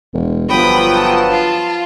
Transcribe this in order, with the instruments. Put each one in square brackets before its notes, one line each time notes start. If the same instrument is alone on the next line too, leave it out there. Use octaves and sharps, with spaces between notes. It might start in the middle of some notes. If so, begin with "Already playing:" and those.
[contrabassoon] E1
[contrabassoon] G1 [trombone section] F3 F#3 B3 [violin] G5 D#6 [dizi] B5
[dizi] A5
[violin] F4